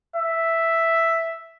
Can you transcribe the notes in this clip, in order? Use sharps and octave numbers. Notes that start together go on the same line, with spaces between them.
E5